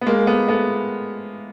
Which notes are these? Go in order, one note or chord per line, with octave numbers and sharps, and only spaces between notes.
B3
G#3 A#3
A3 B3
A3 B3